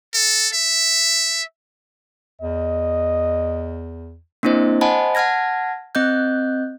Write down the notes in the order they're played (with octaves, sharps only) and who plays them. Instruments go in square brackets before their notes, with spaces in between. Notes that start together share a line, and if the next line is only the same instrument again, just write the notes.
[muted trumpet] A4
E5
[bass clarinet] E2 [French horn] D#5
[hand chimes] A#3 C4 D4 E4 C5 D#5
C5 D#5 F#5 G#5 A5 B5
F#5 A5 F6 G#6 A#6
C4 D#5 F#6 G6